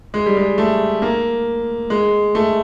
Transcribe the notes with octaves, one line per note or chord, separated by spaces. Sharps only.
G#3
G3
G#3
A3
A#3
G#3
A3